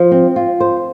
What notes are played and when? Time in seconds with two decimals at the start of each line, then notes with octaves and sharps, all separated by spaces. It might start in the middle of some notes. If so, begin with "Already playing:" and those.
Already playing: F3
0.11 C4
0.36 F4
0.60 C5